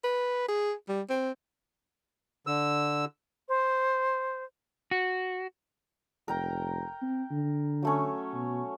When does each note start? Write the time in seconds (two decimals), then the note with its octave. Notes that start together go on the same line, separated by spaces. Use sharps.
0.04 B4
0.48 G#4
0.88 G3
1.09 C4
2.47 D3 E6
3.49 C5
4.91 F#4
6.28 F1 A#4 G5 A#5
7.02 C4
7.31 D3
7.82 F#3 A3 C#4
8.34 B2